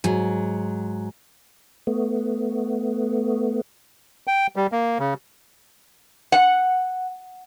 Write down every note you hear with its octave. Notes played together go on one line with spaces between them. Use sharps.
G#2 F#3
A3 B3
G5
G3
A#3
C#3
F#5